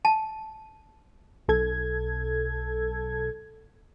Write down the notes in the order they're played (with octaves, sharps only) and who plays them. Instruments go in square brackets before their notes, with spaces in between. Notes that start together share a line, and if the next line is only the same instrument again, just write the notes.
[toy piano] A5
[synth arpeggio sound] B1 A4 G#6